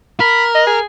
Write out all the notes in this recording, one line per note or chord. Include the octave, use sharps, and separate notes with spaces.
A#4 B5
D#5
G#4